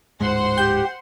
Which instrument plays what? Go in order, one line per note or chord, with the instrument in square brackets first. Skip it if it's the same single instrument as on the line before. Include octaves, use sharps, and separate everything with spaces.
[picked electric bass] D1 G#2 G#3 [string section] C5 F#5 C6
[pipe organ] G4 [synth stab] G6